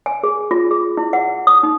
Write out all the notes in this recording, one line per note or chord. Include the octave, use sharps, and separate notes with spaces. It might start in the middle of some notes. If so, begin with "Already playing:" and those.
G#5
G#4
F4
G#4
E4
F#5
D#6
D#4